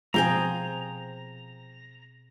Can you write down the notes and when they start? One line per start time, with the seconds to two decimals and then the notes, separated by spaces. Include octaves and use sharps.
0.14 B2 F3 C4 G#4 F5 G5 G#5 A#5